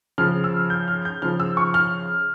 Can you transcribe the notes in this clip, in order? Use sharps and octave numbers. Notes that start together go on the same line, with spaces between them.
C#3 F3 F6
E6
G6
F6
G6
C#3 F3 F6
E6
C#6
F6